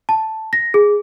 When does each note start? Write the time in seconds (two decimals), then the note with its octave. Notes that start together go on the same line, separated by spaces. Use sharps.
0.09 A5
0.53 A#6
0.74 G#4